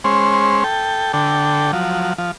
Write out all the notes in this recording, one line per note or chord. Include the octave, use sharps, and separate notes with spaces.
G#3 C#4 C5
A4 G5
D3 A4 G5
F3 F#3
F3